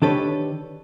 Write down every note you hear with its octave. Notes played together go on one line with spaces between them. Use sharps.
D#3 D4 G4 A4 B4 C#5